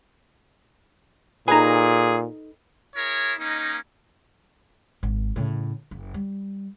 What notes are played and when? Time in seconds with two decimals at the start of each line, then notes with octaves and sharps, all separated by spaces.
1.48 A#2 D#4 G#4 A4 B4 G#5 A#5
2.96 E4 G#4 A#4 C#5
3.39 A#3 C#4 D#4
5.03 G#1
5.36 A2 C#3
5.91 F#1
6.14 G3